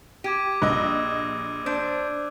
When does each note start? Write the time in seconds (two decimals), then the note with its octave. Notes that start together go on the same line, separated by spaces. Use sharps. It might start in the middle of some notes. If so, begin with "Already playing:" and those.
0.24 G4 D6 G#6 D#7
0.62 A#1 D#5 E6 F#6
1.66 D4 C5